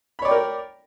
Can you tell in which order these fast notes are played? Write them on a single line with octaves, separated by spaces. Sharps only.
B5 C#5 D5 G5 A#4